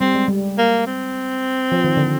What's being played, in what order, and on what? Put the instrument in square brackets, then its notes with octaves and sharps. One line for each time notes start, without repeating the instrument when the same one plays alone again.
[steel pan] G3 [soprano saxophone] C4
[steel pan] G#3
G3
[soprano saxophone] A#3
C4
[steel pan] F3
D#3
D3